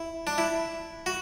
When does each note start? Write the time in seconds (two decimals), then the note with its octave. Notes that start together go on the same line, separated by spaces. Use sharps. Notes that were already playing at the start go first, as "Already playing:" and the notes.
Already playing: E4
0.27 D4
0.38 E4
1.06 F#4